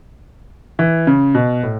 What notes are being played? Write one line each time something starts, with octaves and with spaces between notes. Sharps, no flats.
E3
C#3
B2
A2